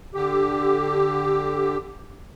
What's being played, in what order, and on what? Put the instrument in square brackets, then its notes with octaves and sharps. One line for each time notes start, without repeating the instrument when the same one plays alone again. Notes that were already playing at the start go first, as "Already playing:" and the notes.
[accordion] D3 G4